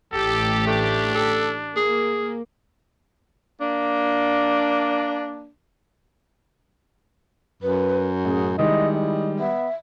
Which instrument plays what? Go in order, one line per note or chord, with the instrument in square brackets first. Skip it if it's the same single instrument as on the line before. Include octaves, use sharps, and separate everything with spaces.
[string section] A1 G4 [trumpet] A4
[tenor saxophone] A3 [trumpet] D4
[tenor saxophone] A4
[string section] A#3 [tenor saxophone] G#4
[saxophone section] A#3 D4
[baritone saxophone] F#2 [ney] B4
[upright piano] A1 [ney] G#4
[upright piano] D#3 G#3 [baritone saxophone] G3 [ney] E4 [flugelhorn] D#5
[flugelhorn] D#5
[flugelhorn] B3 [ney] E5